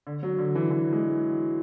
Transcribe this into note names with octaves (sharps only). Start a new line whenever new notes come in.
D3
F#3
D3
E3
E3
G#3